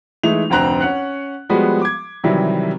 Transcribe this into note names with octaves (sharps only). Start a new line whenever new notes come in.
E3 G#3 A3 D#4 F7
F1 D2 C4 A#5 F#6 F7
C#4 F#5 F#6
F3 G3 G#3 B3 F#4
D6 G#6
C3 D#3 E3 F#3 G3